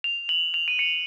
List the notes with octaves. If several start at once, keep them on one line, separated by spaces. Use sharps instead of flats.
F7
F#7
F7
D#7
C#7